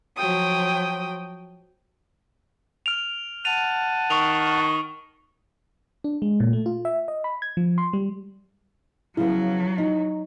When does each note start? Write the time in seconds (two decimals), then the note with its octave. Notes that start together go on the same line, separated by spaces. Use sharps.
0.16 F3 F#3 G5 D#6
2.86 F6 D7 F7
3.45 F#5 A5 D#7 F7
4.10 D#3 C#6 F7
6.04 D4
6.22 G#3
6.40 A#2
6.53 A3
6.66 F4
6.85 E5
7.08 D#5
7.24 B5
7.42 G#6
7.57 F3
7.78 C6
7.93 G3
9.17 C#3 F3 F#3 B3 E4
9.78 D#4